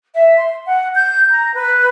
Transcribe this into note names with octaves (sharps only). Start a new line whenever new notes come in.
E5
C6
F#5
G6
A#5
B4